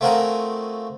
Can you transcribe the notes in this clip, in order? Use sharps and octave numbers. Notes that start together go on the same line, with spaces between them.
A3 C4 F4 F#4 G#4 A#4